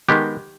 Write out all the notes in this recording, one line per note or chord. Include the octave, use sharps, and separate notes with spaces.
D#3 G#3 B3 G4